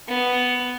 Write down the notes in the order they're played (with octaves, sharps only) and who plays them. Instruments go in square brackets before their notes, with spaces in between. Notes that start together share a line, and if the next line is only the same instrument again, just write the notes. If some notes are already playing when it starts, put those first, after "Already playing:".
[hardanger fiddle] B3